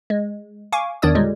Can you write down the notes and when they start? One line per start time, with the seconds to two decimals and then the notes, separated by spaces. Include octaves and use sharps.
0.10 G#3
0.72 F5 G#5 C#6 D6
1.02 E2 D#3 D4 C#5 D5 D#6
1.15 A#2 D3 G3 G#3